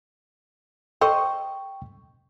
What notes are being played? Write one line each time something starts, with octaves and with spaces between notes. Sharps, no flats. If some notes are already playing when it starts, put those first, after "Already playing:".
A4 C5 D#5 G5 C#6